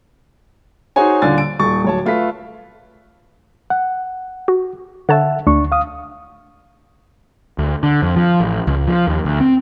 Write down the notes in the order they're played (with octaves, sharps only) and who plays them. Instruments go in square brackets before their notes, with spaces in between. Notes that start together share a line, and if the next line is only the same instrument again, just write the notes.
[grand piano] D#4 F#4 G#4 C5 C#5 G#5
D#1 D3 F4 D5 G#5 A6
D7
D#1 C#6 A6
D1 C#5 A5
A3 F4 A4 B4 B6
[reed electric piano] F#5
[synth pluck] F#4
[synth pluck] D3 C#5 A5 [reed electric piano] E5 F#5
[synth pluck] D2 [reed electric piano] D4 C#6
[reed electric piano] F5 D#6
[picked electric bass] D2
D3
F2
F3
A1
C#2
F3
D#2
D2
C4